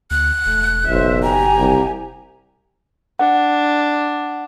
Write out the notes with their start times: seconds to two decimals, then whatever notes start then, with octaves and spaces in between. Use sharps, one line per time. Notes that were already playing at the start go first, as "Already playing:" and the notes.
0.11 D2 F#6
0.46 E1 A3
0.88 F#1 B1 C5 E5
1.23 G4 G#5 A#5
1.57 C2
3.19 D4 F#5